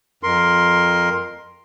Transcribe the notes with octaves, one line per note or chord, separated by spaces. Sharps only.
F2 A#4 C6